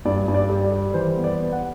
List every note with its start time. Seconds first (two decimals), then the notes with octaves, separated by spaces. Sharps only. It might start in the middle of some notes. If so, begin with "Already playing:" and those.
0.05 G2 D5
0.28 G2
0.34 D5
0.49 G3
0.64 D5
0.72 G3
0.94 E3 C5
1.17 B3
1.24 D5
1.38 B3
1.52 F#5